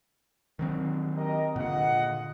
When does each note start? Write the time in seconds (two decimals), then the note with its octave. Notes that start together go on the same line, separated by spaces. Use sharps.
0.59 D#3 F#3 C4
1.17 G4 A#4 D#5
1.56 A#2 D3 F4 D#5 F#5